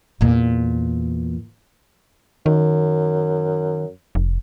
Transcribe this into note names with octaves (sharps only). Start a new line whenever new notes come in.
E2 A#2
F#2 D#3
F1